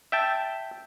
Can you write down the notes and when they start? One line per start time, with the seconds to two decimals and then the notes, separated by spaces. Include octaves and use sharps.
0.12 E5 G5 A5